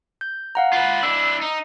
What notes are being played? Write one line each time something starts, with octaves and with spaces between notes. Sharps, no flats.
G6
F5 F#5 A#5
F4 B4
D4 E4 E6
D#4